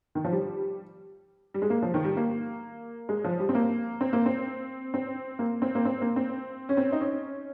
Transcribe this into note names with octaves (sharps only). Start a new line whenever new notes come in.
D#3
F3
G3
G3
G#3
A#3
F3
D#3
G3
A#3
G#3
F3
G3
C4
A#3
C4
A#3
C4
C4
A#3
C4
A#3
C4
A#3
C4
C#4
C4
D#4
C#4